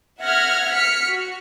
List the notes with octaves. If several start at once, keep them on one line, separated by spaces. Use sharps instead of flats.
E5 F#5 F6 G#6 A#6
F6 B6 C#7
F#4